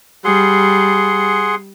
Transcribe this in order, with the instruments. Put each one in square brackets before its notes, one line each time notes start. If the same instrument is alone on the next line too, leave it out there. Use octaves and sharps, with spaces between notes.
[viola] G3 [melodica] G#4 F#5 C6